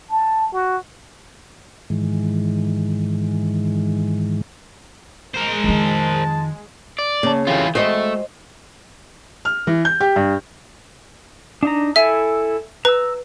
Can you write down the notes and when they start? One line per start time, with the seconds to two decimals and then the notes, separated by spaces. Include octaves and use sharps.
0.10 A5
0.53 F#4
1.90 G#2 D#3 E3 G#3
5.34 G#3 A#4 C5
5.64 F2 D#3 A5
6.99 D5
7.23 C#3 A#3 A5
7.47 E3 C4 F4 G4 A4
7.75 G#3 A3 F#4 G#4 C5 D#5
9.45 F6
9.67 E3
9.85 G6
10.00 G4
10.16 G2
11.63 D4 D#4 A#5
11.96 E4 A4 E5 G#5
12.85 B4 A#5 E6